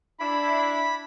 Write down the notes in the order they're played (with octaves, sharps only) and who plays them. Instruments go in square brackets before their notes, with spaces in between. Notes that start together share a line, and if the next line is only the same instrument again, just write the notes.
[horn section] D4 E4 [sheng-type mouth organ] B5